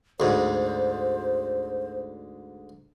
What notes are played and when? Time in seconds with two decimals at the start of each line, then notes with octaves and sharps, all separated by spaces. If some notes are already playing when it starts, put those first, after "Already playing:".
0.20 D2 G#2 C5